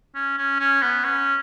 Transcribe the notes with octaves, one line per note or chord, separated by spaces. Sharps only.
C#4
C#4
C#4
B3
C#4